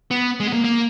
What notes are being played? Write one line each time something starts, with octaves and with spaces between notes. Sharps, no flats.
B3
G#3
B3
A#3
A#3